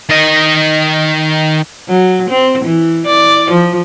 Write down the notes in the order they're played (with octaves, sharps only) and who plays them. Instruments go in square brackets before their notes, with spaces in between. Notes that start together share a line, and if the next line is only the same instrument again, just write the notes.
[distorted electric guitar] D#3 D#5
[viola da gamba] F#3
C4
E3
D5
F3